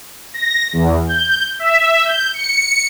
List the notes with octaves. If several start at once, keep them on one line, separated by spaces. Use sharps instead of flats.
A#6
E2
G6
E5
G6
C#7